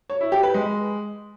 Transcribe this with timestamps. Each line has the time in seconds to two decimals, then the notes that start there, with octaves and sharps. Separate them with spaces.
0.10 C#5
0.21 E4
0.32 G4
0.43 B4
0.54 G#3